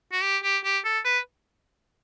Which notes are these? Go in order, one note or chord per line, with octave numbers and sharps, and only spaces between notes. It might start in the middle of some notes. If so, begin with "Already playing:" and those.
F#4
G4
G4
G4
A4
B4